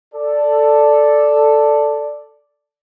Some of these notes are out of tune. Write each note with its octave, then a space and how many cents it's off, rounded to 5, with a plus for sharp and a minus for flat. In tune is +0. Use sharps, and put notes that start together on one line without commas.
A4 +0 D5 +0